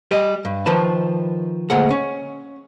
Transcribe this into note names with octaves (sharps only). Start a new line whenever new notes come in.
G3 G4 D#5
G2
D#3 F3 B4 A5
D2 A#2 G#3 F#5
C#4